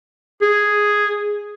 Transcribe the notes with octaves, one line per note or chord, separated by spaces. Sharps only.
G#4